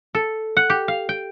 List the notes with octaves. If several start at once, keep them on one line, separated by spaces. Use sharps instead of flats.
A4
F#5
G4
F5
G5